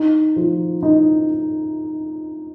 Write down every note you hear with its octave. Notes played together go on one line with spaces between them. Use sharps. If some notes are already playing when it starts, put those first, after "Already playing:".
Already playing: D#4
F3
D#4